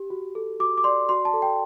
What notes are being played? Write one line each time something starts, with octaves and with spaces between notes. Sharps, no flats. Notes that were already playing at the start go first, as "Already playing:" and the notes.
Already playing: G4
F#4
A4
F#4 D6
D6
D5 C6
F#4 C6
A5
A4
G5